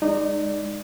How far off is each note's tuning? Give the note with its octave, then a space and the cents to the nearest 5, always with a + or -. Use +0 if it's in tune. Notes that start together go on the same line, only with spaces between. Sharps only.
G#3 -10 D#4 -20 D5 +0